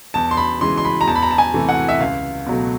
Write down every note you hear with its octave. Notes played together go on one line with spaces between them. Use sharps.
E2 A5
C6
B5
C#3 E3 G#3 C6
C6
B5
A#5
E2 A5
B5
A#5
A5
G#5
C3 E3 A3
F#5
E5
C#2 F5
B2 F#3 A3